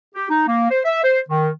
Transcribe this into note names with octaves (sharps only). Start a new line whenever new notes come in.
G4
D#4
A#3
C5
E5
C5
D#3